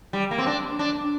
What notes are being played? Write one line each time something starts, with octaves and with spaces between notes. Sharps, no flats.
G3
A#3
C4
D4
D4